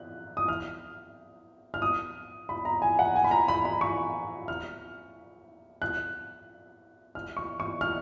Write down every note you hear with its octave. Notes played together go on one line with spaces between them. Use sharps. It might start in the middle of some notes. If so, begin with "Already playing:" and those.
Already playing: F#6
D#6
F6
F6
D#6
B5
A#5
G#5
F#5
G#5
B5
A#5
B5
B5
C#6
F6
F#6
F6
C#6
C#6
F6